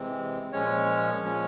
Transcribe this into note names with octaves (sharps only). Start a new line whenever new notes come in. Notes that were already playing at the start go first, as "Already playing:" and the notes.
Already playing: C3 E3 G#3 C4
A#2 F3 G#3 C#4 C#5
A#2 F3 G#3 C#4